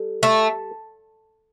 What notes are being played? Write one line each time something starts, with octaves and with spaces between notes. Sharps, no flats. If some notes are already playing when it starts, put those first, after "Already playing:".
Already playing: G3 A4
A3